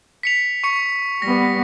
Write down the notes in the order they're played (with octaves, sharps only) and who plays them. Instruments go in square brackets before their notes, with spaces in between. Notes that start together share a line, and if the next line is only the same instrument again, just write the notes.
[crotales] B6 C#7 F7
C#6 C#7
[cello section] G3 B3 [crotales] A#6